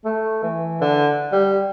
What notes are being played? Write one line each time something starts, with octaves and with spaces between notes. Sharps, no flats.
A3
E3
D3
G3